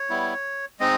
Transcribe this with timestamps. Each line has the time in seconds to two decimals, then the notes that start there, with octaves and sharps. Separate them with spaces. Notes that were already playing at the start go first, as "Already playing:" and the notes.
Already playing: C#5
0.10 G3 B3 E4
0.80 G#3 C4 D#4 D#5